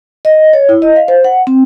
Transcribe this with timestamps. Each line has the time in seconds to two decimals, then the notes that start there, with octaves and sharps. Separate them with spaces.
0.25 D#5
0.53 C#5
0.69 E4
0.82 D#5
0.96 F5
1.08 C5
1.24 F#5
1.47 C4